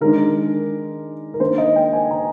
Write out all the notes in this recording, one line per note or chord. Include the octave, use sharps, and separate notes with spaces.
D#3 G#3 D4 A#4
A#4
D#3 A#3 D4 C5
D#5
G5
G#5
A#5